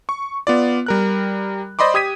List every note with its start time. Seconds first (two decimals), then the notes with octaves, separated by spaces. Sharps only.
0.09 C#6
0.47 B3 F4 D5
0.86 G3 A#4 F#6
1.79 C5 D5 D#5 B5 C6 D6
1.94 G4 D#6 G#6 B6 D#7